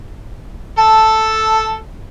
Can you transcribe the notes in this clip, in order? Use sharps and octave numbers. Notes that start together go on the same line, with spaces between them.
A4 A5